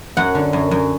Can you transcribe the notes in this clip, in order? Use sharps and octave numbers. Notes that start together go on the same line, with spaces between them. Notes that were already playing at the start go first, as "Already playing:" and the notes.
F#2 F#5
D3
F#2
F#2